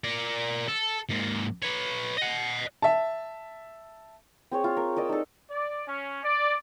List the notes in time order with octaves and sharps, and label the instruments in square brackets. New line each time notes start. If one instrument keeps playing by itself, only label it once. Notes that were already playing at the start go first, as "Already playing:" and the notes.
[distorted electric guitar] A#4 D5
A4
G#2 A#3
B4 C#5
D#5 F#5
[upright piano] E5 A5
[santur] C4 G#4 C#5
F4
A#4
A#4 D5 D#5 E6
D#4 A4
[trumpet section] D5
C#4
D5